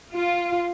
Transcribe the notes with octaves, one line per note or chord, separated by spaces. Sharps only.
F4